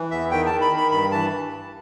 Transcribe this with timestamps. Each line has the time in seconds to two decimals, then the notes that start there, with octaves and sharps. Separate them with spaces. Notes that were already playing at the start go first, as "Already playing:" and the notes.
Already playing: E3
0.11 E2 E5
0.31 D#3 G5
0.46 A5
0.51 D#3
0.61 B5
0.72 D#3
0.77 B5
0.91 G2 B5
1.11 E3 A5